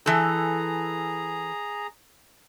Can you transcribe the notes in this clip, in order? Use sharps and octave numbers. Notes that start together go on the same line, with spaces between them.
E3 G#4 A4 A#5